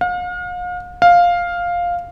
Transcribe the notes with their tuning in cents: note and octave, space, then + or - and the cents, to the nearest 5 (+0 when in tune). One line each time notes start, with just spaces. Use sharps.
F5 +40
F5 +5